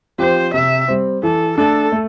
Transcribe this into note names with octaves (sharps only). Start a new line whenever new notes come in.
F3 C4 G4 C5
C3 E5
G3 C4
E3 A4
A3 D4 A4
A3